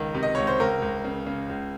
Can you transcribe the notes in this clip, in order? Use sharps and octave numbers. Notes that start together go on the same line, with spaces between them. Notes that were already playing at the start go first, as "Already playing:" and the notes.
Already playing: C#2 D#3
C3
D#5
C#2 C#5
C5
C#2 A#4
C#2
C#3
C#3
C#2